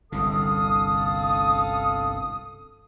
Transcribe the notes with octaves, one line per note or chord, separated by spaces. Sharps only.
G1 C2 D3 A4 F5 D#6